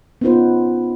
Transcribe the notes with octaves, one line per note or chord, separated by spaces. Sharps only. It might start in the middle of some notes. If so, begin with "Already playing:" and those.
B3 C#4 D#4 F4 B4 C5